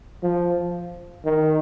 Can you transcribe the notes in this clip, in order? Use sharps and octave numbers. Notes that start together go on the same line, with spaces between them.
F3
D#3